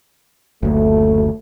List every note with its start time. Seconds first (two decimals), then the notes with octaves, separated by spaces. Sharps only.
0.63 F#1 D2 A3